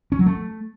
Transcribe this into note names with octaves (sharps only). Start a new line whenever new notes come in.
C#4
F#3
A3